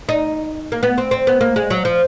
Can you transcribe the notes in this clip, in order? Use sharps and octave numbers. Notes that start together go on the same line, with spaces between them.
D#4
A#3
B3
C4
C4
B3
A#3
G#3
F#3
F3